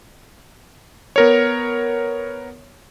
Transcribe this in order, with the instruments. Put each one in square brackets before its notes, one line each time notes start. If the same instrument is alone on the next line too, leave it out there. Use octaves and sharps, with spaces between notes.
[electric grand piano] B3 A#4 C#5